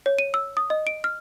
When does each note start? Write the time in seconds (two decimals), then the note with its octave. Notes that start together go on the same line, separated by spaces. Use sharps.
0.06 C#5
0.19 D#7
0.34 E6
0.57 D#6
0.70 D#5
0.87 D7
1.04 F6